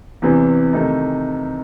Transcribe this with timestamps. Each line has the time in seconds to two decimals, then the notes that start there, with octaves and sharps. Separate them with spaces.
0.22 E2 C3 E3
0.73 C3 D#3 A3 D#4